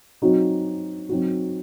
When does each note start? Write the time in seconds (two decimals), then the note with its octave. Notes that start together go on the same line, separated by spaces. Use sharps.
0.22 F#3 C4 D#4 F#4
1.09 F#3 C4 D#4 F#4